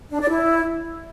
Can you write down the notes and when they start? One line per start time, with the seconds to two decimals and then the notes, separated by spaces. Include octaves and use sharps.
0.10 D4
0.20 D5
0.30 E4